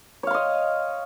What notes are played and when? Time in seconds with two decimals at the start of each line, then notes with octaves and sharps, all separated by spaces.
0.23 C#5
0.27 F5
0.31 C6
0.34 D#5